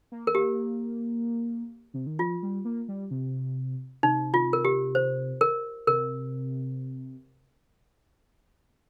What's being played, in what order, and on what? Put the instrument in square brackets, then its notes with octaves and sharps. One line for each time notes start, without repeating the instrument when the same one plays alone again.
[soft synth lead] A#3
[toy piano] A#4
[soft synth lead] A#3 [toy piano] G4
[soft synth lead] C3
D#3
[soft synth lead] F3 [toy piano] F4
[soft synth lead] G3
A#3
G3
C3
[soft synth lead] C3 [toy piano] D#4
[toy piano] F4
A#4
G4
C5
A#4
[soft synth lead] C3 [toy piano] A#4